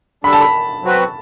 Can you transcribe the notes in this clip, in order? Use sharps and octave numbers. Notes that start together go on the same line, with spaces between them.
D3 G3 D4 A4 B5
A5
B5
F#3 C4 F#4 B4